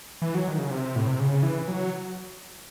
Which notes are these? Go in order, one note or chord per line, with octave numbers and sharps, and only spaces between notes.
E3
F#3
D#3
C#3
C3
A2
C3
C#3
E3
F#3